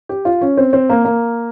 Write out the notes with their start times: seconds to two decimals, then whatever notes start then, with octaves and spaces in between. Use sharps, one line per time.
0.09 G4
0.25 F4
0.41 C#4
0.57 C4
0.73 C4
0.89 A#3
1.05 A#3